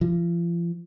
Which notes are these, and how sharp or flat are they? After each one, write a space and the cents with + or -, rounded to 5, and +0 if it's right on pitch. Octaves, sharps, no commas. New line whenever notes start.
F3 -35